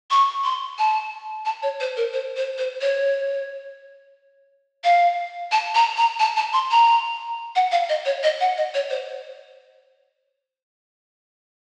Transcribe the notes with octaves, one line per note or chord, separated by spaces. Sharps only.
C#6
C6
A5
A5
C#5
C5
A#4
C5
C5
C5
C#5
F5
A5
A#5
A#5
A5
A5
C6
A#5
F#5
F5
D#5
C#5
D#5
F#5
D#5
C#5
C5